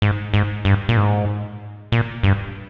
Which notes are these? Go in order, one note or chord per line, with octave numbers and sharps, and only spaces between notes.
G#2
G#2
G2
A#2
G#2
A#2
G2